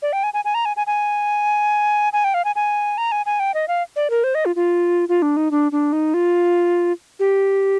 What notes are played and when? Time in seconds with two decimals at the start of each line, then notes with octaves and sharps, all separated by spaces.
0.02 D5
0.13 G5
0.23 G#5
0.34 G#5
0.45 G#5
0.55 A#5
0.65 G#5
0.77 G#5
0.87 G#5
2.13 G#5
2.24 G5
2.34 F5
2.45 G#5
2.56 G#5
2.98 A#5
3.12 G#5
3.26 G#5
3.40 G5
3.54 D#5
3.68 F5
3.96 D5
4.10 A#4
4.24 C5
4.35 D#5
4.45 F4
4.56 F4
5.09 F4
5.22 D4
5.37 D#4
5.51 D4
5.72 D4
5.93 D#4
6.14 F4
7.19 G4